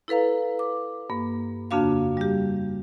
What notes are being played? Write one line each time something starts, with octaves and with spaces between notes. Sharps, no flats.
E4 A4 B4 F5 A#5
D6
G2 A#3
F2 C#3 A#3 D4 F#4 F5
G3 G4